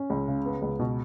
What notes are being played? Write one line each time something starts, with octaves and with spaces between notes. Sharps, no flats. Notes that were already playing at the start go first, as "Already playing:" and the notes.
Already playing: C#4
C#2
C#3
B3
C#2
B2